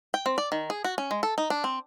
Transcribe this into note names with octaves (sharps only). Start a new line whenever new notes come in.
G5
C4
D5
D#3
G#4
F#4
C#4
G#3
A4
D#4
D4
C4